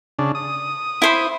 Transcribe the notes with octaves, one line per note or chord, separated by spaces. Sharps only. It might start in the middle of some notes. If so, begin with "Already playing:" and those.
C#3 D4
D#6
E4 C5 B5